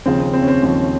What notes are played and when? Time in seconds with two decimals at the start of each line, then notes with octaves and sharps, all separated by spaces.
0.05 D#2 C#3 F3 C4
0.20 C4
0.33 C4
0.42 C#4
0.48 C4
0.63 D#2 C#3 F3 C4